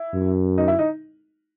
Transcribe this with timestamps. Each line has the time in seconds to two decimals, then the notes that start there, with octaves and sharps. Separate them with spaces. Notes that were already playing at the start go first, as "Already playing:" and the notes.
Already playing: E4
0.13 F#2
0.58 D#4
0.68 E4
0.79 D#4